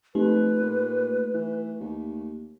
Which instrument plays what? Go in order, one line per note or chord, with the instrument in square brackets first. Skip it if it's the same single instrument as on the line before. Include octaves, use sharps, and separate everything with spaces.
[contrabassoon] F2 [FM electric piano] A3 [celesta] D#4 E4 G4 [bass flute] B4
[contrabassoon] A#2
E3
D#2